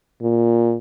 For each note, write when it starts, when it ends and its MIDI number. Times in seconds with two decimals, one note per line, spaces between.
0.22 0.77 46